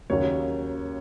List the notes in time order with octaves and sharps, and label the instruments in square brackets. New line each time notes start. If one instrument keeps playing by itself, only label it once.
[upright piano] D#2 C#3 F#3 A#3 C#5